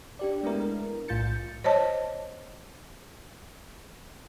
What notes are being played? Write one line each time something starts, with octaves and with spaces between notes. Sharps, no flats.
D4 G4 D5
G#3 A3 B3 D4 E4 A#4
B1 A2 F4 G6 A6 C#7
C5 C#5 D#5 A5